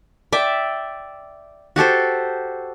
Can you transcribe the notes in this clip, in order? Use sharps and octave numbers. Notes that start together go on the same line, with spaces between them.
D5 E5 G5
F#4 G4 A4 C5